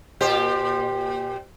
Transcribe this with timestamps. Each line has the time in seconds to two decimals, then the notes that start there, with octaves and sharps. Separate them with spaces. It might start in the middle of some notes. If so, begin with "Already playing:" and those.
0.21 A#2 G4 C5